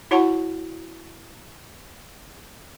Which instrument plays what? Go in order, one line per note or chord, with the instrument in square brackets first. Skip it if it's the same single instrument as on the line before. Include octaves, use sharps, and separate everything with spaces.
[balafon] E4 F#4 C#5 F#5 A5 C#6